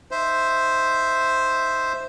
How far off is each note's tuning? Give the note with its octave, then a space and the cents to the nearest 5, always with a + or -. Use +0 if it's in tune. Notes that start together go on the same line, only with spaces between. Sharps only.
D#4 +0 C5 +0 E5 +0